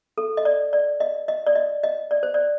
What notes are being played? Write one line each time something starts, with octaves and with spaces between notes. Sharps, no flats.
A4
D#5
D5
D5
D#5
D#5
D5
D#5
D#5
D5
C5
D5